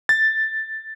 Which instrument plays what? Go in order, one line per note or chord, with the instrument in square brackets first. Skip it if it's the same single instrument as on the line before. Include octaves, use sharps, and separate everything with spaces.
[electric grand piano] A6